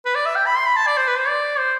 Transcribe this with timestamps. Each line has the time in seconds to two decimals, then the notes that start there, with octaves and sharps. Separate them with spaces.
0.05 B4
0.15 D5
0.26 E5
0.36 G5
0.46 B5
0.56 C6
0.66 B5
0.76 A5
0.87 D5
0.97 C5
1.07 B4
1.17 C5
1.28 D5
1.59 C5